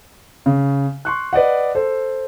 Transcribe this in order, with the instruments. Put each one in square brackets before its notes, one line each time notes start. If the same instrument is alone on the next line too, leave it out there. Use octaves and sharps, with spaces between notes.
[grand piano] C#3
C6 C#6 F#6
B4 D5 D#5 F#5
A4 C5